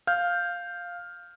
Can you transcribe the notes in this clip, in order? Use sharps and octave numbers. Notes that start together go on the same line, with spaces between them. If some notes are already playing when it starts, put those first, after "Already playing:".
F5 F6 G6